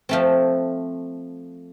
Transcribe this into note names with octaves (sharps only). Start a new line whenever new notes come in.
F3 A3 C4